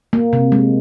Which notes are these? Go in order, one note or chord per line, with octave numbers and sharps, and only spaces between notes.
A#3
C3
G#3